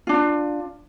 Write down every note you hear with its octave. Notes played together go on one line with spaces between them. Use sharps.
D4 F4